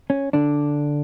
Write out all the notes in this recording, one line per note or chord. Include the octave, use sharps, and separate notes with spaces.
C#4
D3 D4